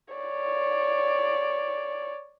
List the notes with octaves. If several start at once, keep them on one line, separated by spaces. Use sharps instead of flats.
C#5 D5